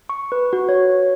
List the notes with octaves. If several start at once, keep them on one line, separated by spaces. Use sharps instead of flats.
C#6
B4
F#4
C#5